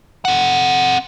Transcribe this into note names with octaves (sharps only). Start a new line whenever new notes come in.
C4 F#5